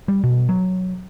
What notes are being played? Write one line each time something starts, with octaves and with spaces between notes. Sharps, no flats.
G3
B2
F#3